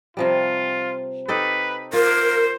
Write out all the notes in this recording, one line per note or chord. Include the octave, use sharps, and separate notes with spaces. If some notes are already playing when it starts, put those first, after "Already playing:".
C3 F3 G3 F4
D#4 G4 A4 B4
F4 A#4 C5